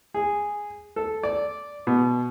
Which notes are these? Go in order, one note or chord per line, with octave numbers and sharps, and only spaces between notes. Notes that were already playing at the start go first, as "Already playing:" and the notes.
G#4
A4
D5
B2